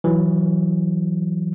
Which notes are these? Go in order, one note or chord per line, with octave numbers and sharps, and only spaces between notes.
E3 F#3